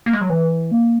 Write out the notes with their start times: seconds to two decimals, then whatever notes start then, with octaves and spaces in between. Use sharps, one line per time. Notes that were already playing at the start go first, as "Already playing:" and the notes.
0.06 A#3
0.13 G#3
0.21 F#3
0.30 E3
0.71 A#3